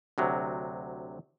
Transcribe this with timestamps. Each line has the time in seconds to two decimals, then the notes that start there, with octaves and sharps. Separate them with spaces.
0.18 D2 C3 F#3